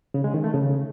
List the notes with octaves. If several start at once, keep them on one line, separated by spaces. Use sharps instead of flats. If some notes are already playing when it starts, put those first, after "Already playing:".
C#3
G#3
D#3
A3
C#3